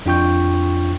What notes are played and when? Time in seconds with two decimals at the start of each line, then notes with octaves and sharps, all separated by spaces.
0.06 F2 D4 F4 G5 C#6 G6